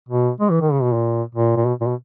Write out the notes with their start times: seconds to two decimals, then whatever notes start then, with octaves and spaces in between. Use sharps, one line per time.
0.09 B2
0.40 G#3
0.51 E3
0.61 D#3
0.72 C#3
0.83 B2
0.93 A#2
1.35 A#2
1.57 A#2
1.66 B2
1.81 A#2
1.87 B2